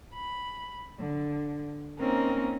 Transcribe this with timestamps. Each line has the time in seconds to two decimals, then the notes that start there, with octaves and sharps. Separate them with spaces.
0.14 B5
0.99 D3
1.99 A#3 C4 C#4 D#4 A#4